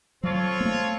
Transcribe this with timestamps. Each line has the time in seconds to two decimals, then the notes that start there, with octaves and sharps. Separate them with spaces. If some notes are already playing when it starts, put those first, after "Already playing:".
0.23 F3 F#3 C4 F4 A4 C#5
0.60 A#3
0.65 A3